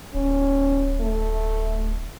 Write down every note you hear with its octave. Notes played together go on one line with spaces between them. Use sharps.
D1 C#4
A3